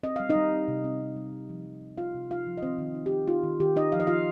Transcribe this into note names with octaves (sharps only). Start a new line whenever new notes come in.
C4 D#5
G3 F5
D#4 D#5
G3
C4
C3
C4
C4
G3
C3
F3
F3
C3
C3 F4 F5
C3
D#4 F4 F5
F3
D#5
D#3 C4 C5
D#3
D#4
G4
D#4
D#4 F4
D#3
D#3 G4
D#4 D#5
F3 F5
D#5
F3 F4 F5